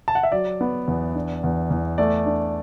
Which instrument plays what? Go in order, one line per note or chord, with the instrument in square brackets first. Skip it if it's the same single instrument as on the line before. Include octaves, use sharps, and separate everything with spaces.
[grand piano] A5
F#5
E5
F#3 D5
B3
E2
D4
E2
E2
A3 D5
D4